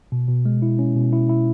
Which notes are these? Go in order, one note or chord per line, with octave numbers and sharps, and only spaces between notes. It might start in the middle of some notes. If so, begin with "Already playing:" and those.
B2
B2
G#3
E4
C#4
B2
E4
E4